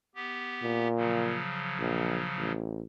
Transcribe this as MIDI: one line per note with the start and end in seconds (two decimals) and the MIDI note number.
0.15 0.88 59
0.15 0.88 67
0.63 1.42 46
0.97 2.52 49
0.97 2.52 53
0.97 2.52 54
1.80 2.25 34
2.37 2.84 33